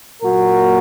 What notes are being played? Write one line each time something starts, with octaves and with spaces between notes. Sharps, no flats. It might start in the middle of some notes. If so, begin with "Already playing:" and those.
A#2 F#3 A#3 F#4 A#4